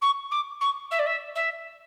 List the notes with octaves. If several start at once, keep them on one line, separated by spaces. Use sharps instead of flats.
C#6
D6
C#6
E5
D5
E5
E5